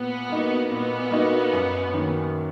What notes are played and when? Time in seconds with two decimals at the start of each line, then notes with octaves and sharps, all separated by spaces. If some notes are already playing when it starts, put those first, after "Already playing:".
Already playing: A#2 B3
0.30 A#3 D#4 F#4
0.70 A#2 B3
1.11 A#3 D#4 F#4
1.53 F#2
1.93 D#3 F#3 A#3 C#4